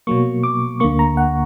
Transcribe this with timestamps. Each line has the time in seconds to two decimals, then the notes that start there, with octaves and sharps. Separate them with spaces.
0.07 B2 F#3 A#3 C#6
0.43 D6
0.80 D2 D3 A#3 C#6
0.99 A#5
1.17 F#5